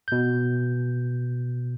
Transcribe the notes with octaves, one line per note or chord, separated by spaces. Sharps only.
B2 G6